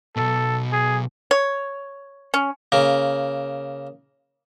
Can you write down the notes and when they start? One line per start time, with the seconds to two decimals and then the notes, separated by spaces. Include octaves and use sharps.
0.17 B1 B2 A4
0.72 G#4
1.31 C#5
2.34 C#4
2.72 C#3 A#3